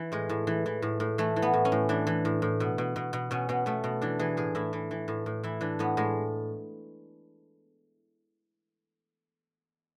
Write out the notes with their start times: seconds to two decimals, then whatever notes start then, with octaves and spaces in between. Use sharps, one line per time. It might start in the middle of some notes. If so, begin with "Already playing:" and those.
Already playing: E3
0.12 A2 G#3
0.29 A2
0.47 E3
0.66 E3
0.82 A2
1.00 A2
1.18 E3 A3
1.36 E3
1.42 B3
1.54 A2
1.65 C#4
1.72 A2
1.89 E3 D4
2.07 E3
2.25 A2
2.42 A2
2.60 B2
2.78 B2
2.96 B2
3.13 B2
3.31 B2 C#4
3.49 B2 B3
3.66 B2 A3
3.84 B2
4.02 E3 D4
4.19 E3 G#4
4.37 A2 G#4
4.55 A2 E4
4.73 E3
4.91 E3
5.08 A2
5.26 A2
5.43 E3 E4
5.61 E3 D4
5.79 A2 B3
5.97 A2 G#3